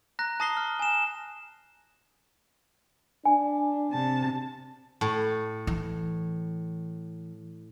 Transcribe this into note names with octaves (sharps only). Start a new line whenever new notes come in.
A#5 F#6 A#6
A5 D#6 A#6 C7 G7
F6
G#5 E7
D4 G#5
C3 A5
A2
E3